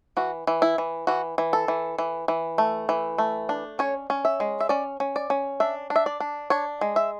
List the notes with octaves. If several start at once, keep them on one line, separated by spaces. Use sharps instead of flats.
E3 F#4
E3
E4
E3
E3 F#4
E3
A4
E3
E3
E3
A3
E3
A3
D4
C#4 C#5
C#4
E5
G#3
E5
C#4 D5
C#4
D5
C#4
D4 E5
D4
E5
D5
D4
D4 C#5
G#3
E5